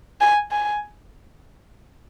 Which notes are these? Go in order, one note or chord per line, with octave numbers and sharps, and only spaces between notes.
G#5
G#5